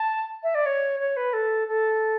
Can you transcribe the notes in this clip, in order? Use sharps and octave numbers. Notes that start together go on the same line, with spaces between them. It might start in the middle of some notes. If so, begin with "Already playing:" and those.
Already playing: A5
E5
D5
C#5
C#5
B4
A4
A4